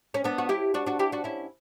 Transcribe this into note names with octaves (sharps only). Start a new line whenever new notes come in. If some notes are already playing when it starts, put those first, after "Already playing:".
C#4
B3 D4
F#4
E4 G4
D4 F#4
D4 F#4
E4 G4
D4 F#4
C#4 E4